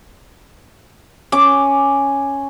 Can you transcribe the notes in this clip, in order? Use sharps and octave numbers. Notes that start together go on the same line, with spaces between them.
C#4 D6